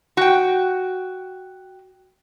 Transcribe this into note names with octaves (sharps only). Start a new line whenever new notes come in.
F#4 G5